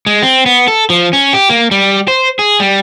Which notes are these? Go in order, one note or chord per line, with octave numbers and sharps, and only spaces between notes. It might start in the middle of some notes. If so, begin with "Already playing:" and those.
G#3
C4
B3
A4
F3
C#4
G4
A#3
G3
C5
G#4
G3